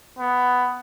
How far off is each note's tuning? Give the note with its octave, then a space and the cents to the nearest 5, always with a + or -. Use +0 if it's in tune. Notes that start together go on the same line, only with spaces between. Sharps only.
B3 +10